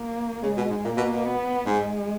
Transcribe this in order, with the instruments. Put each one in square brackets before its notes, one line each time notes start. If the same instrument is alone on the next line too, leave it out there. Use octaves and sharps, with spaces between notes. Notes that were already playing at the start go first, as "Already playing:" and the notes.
Already playing: [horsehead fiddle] A#3
[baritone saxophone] C#3 [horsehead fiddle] G#3
[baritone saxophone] B2
G#2
[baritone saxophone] A#2 [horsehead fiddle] A#3
[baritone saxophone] B2
B2
[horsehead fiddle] B3
[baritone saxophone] G#2 [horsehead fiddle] G#3